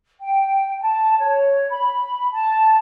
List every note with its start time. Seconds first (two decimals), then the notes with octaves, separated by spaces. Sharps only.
0.20 G5
0.80 A5
1.18 C#5
1.69 B5
2.33 A5